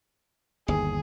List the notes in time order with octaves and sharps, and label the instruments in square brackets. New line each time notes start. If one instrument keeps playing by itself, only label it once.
[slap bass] G1 D#2 [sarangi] G#4